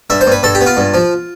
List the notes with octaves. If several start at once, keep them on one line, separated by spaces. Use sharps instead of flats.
G2 E5
C5
G2
B4
G2 A4
G4
B3
F4
G2
F3